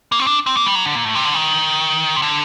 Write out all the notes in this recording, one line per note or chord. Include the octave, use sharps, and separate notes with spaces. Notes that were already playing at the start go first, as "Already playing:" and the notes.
A#3
C4
D4
C4
A#3
G3
F#3
D3
A#2
A2
C3
D3
D#3
C3
D3